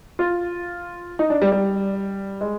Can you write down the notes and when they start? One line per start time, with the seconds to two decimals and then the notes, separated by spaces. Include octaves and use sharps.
0.19 F4
1.19 D#4
1.30 D4
1.42 G3
1.52 G3
2.41 G#3